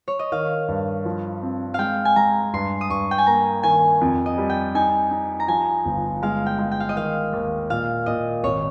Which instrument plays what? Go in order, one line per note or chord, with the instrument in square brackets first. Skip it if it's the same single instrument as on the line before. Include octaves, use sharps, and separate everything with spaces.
[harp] C#5
D#5
[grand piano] D#3 [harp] F5
[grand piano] G2
F3
C4
[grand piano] G#3 [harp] F5 G5
[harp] G#5
[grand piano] G#3 [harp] A#5
[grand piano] G2 [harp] C6
[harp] D#6
[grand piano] G2 [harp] C#6
[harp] G5
G#5
[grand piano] A#3 [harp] A#5
[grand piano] D#3 [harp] G#5
[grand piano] F2
[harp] D#5
[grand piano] G3
[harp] G5
[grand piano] D#4 [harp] G#5
[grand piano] D#4
[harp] A#5
[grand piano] F3 [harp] G#5
[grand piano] G1
[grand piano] G#3 [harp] F5
[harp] G5
[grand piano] G#3
[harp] G5
F5
D#5
[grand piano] D#3 [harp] F5
[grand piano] D#2
[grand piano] A#2 [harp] F5
[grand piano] A#2 [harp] D#5
[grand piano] G#1 [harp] C#5